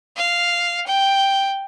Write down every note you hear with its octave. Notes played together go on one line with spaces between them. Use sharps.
F5
G5